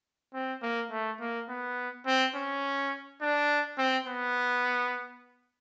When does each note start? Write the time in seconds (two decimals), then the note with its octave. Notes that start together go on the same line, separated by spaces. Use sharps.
0.34 C4
0.62 A#3
0.91 A3
1.21 A#3
1.49 B3
2.07 C4
2.35 C#4
3.22 D4
3.78 C4
4.07 B3